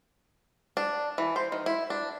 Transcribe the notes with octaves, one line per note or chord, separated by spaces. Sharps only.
D4
E3
C5
D#3
E4
D4